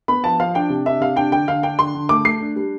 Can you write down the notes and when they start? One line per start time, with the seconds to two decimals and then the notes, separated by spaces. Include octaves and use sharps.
0.08 B3 B5
0.24 F3 A5
0.40 F3 F5
0.55 D4 G5
0.70 C3
0.86 D4 E5
1.01 C3 F5
1.16 D4 G5
1.32 D3 G5
1.48 D3 F5
1.63 D4 G5
1.78 D3 C6
1.95 D3
2.09 A3 D6
2.25 A3 C7
2.41 D4
2.56 G3